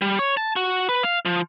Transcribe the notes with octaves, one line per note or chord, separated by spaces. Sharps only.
G3
C#5
A5
F#4
B4
F5
F3